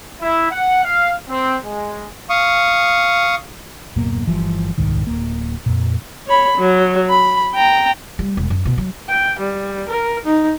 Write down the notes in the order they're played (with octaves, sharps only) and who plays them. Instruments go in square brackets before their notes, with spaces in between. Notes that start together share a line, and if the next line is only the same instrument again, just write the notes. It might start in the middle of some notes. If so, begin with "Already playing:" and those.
[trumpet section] E4
F#5
F5
C4
G#3
[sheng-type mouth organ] F5 C#6 D#6
[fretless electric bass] D1 F#2 B2 A#3
G1 E3 F3 G3
D#1 C2 G#2 D#3
D1 A#3
F2 A#2
[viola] C#5 B5
F#3
B5
G5 A#5
[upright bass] G3
E1
F#2
B2
F#3
[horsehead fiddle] G5
G3
A#4
D#4